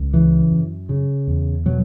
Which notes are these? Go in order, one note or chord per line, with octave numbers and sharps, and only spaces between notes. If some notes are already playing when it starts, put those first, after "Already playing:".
Already playing: C#2
C#3 E3
F#2
C#3
E2
B2 F#3